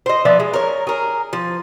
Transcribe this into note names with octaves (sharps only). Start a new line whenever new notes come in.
C5 D#5
F3 B3 D5 E5
G#3
A#4 C#5
G#4 A#4
F3